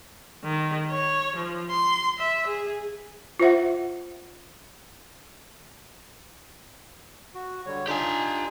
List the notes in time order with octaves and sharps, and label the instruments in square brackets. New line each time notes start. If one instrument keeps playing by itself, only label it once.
[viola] D#3
C#5
F3
C6
E5
G#4
[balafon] F4 C5 E5 F#5
[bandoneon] F#4
D3 G3 C#5
[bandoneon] D4 D#4 F4 [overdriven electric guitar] G4 G#5